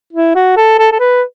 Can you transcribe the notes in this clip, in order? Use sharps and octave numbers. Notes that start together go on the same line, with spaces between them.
E4
F#4
A4
A4
A4
B4